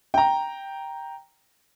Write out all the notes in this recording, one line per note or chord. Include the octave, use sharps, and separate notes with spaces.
G5 A#5